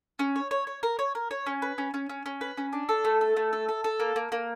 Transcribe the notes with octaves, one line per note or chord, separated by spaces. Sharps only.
C#4
C#5
C#5
C#5
A#4
C#5
A#4
C#5
C#4
B4
C#4
C#4
C#4
C#4
B4
C#4
D4
A4
A3
A4
A3
A4
A4
A4
A#3
A#3
A#3